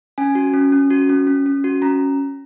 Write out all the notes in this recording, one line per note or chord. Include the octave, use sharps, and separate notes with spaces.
C#4 G#5
F#4
C#4
C#4
F#4
C#4
C#4
C#4
F#4
C#4 A#5